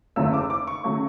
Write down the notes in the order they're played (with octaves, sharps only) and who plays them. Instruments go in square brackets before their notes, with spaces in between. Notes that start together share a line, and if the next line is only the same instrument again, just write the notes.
[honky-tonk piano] F#1 E2 C#3 F#3 A3 E6
D6
D6
C#6
C#3 F#3 A3